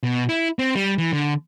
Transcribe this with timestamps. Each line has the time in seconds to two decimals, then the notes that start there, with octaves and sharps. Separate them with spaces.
0.04 B2
0.29 E4
0.59 C4
0.76 G3
0.98 E3
1.13 D3